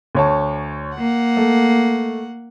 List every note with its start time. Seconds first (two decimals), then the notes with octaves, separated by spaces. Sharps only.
0.15 D2 C#5 A5
0.96 A#3 F#5
1.37 A3